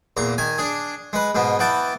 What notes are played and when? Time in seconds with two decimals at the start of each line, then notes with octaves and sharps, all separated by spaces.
0.17 E2 A#2 A#5
0.38 D#3 G#5
0.58 D4 G#4
1.13 G#3 B4
1.35 G#2 B2 B3
1.59 E3 B3 G5 A5